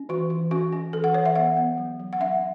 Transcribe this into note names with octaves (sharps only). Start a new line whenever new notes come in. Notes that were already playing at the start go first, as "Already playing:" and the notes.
Already playing: C#4
E3 F#4
E3
C#4 F#4
C#4
E3 A4
F#5
E3 C#5
E5
B3 F#5
B3
F#3
F#3
F#5
C#4 E5